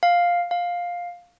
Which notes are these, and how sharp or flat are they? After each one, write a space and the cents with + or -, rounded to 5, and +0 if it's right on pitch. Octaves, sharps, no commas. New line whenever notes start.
F5 +5
F5 +10